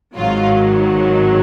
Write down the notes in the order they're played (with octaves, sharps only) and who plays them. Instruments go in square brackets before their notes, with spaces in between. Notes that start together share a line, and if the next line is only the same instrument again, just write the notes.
[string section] G#1 G#2 D#3 F#3 F4